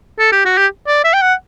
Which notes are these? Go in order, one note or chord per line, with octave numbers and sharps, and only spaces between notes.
A4
G4
F#4
G4
D5
E5
G5
F#5